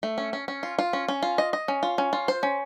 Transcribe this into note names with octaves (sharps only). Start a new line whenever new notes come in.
A3
C#4
C#4
C#4
F4
F4
C#4
C#4
F4
D#5
D#5
C#4
F4
C#4
F4
C5
C#4